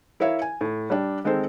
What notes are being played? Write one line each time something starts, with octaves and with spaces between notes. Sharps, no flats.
E4 A#4 C#5 E5 F5
G#5
A2
G3 D4
D#3 G#3 C4 A4 C5